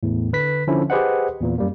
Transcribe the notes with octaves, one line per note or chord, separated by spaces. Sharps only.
E2 A2
D3 B4 B6
D3 F3 C#4 D4 E4
G4 G#4 B4 C5 D#5 F#5
E2 A#2 E3
F#2 G3 A#3